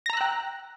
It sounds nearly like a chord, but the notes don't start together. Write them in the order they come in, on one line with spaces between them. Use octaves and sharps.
A#6 A#5 E6 F#6 G5